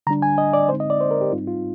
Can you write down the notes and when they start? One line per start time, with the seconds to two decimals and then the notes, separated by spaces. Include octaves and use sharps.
0.07 D3 G3 D4 A#5
0.22 G#5
0.38 D#5
0.53 D5
0.69 D3 G#3 C4 D#4 C5
0.80 D#5
0.90 D5
1.01 C5
1.11 A#4
1.21 G4
1.32 G#2 G3 C4 D#4 F4
1.48 F4